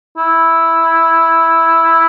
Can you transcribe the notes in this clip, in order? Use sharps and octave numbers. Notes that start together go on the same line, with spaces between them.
E4